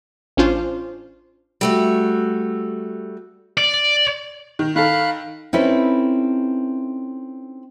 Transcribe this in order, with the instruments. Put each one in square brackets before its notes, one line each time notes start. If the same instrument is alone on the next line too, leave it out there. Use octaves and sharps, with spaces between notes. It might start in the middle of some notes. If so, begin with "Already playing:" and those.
[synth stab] A1 C#4 D4 F4 C5
[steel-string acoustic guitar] G3 A3 F#4
[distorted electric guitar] D5
[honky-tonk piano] D#3
[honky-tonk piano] D#3 A4 [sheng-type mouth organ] F5 B5 F#6
[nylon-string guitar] C4 C#4 D#4 E4 A4 B4